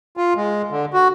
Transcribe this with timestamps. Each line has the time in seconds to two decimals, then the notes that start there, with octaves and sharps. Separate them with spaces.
0.17 F4
0.36 G#3
0.71 D3
0.94 F#4